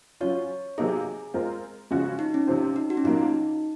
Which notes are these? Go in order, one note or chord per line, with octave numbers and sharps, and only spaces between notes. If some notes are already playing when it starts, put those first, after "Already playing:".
F#3 C#4 F4 C#5
C3 F#3 A#3 D#4 G#4
G#3 C4 F4 A#4
C#3 F3 G#3 C#4 F#4
D#4
C#4
C3 F3 C4
D#4
F#4
C#4
A#2 F#3 A#3 D#4